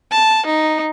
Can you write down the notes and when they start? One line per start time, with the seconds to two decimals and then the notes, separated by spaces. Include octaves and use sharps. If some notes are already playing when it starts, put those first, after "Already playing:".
0.11 A5
0.46 D#4